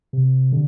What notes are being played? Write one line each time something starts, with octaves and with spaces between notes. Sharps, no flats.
C3
D3